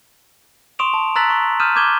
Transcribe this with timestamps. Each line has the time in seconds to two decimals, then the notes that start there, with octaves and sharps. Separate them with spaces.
0.79 C6 C#6 D#6 D7 E7 F7
0.94 A5
1.15 A#5 E6 F#6 A6 B6 F#7
1.30 C#6
1.60 D#6 F6 G6 D#7 E7
1.76 D6 G6 G#6 E7 G7